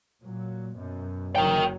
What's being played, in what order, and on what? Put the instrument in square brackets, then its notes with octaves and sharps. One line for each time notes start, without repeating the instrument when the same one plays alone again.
[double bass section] A#2 F#3
F#2 B2
[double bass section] F#1 F#3 [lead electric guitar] A#4 G5